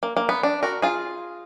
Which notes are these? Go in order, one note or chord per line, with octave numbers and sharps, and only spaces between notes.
A#3
A#3
B3
D4
F#4 A#4
F4 G#4